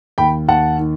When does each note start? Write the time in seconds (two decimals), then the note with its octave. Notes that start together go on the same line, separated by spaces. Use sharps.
0.18 D#2 G5 B5
0.48 D#2 F#5 A5
0.79 D#3